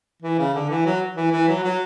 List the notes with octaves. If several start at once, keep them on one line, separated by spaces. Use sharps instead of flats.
E3
C#3
D3
E3
F#3
E3
E3
F#3
F#3